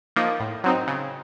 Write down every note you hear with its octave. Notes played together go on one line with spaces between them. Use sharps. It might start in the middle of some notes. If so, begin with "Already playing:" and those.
F3 A#3 D#4
A2
F#3 C4 D#4
C#3